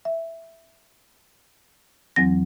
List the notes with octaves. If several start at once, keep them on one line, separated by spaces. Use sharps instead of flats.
E5
E2 E3 F#3 C4 A#6